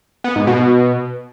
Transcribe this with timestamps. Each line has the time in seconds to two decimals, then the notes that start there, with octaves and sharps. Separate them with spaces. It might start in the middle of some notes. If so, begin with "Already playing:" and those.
0.24 B3
0.36 G#2
0.47 B2